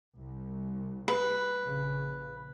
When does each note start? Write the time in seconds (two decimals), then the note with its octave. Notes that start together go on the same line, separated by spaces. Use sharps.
0.15 C2
1.08 B4
1.61 A#1 C#3